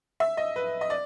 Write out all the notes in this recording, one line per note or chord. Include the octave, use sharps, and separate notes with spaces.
E5
D#5
B4
D#5
D5